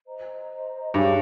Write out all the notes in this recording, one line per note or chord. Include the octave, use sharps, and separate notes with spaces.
C5 D#5 A#5
G2 G#4 C#5 G#5 C#6